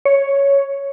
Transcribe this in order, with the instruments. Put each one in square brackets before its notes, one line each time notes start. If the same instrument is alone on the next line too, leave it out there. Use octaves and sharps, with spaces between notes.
[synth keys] C#5